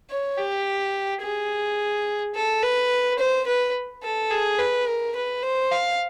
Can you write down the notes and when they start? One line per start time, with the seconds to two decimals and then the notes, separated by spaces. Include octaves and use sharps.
0.10 C#5
0.38 G4
1.22 G#4
2.35 A4
2.62 B4
3.19 C5
3.47 B4
4.03 A4
4.31 G#4
4.59 B4
4.87 A#4
5.16 B4
5.43 C5
5.72 F5